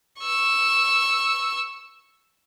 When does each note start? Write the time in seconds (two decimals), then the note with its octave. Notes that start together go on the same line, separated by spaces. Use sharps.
0.20 C#6 E6